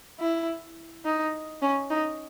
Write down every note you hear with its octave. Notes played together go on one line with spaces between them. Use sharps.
E4
D#4
C#4
D#4